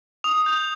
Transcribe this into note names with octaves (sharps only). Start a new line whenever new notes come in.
D#6 F7
G6